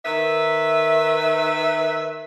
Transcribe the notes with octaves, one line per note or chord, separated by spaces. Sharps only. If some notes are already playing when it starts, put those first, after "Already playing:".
D#3 B4 E5